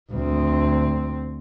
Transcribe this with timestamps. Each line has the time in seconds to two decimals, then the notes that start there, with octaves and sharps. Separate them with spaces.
0.12 D2 C4